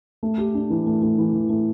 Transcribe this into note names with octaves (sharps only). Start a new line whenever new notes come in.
A3
G4
D4
E3
A3
A3
E3
E3
A3